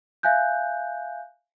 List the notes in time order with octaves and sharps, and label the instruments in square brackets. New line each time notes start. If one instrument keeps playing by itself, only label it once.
[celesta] E5 F5 G#5 F#6 G6